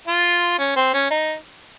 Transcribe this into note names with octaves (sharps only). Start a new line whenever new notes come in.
F4
C#4
C4
C#4
D#4